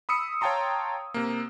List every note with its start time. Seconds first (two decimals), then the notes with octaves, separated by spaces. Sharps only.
0.09 B5 D#6 E6 C#7
0.41 C#5 F5 G5 A5 A#5 C6
1.14 C3 A#3